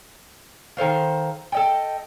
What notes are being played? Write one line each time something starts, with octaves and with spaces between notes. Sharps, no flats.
D#3 A4 C5 F5
A4 D#5 G5